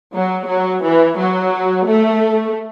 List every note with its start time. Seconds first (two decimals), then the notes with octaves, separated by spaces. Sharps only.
0.14 F#3
0.49 F#3
0.84 E3
1.19 F#3
1.88 A3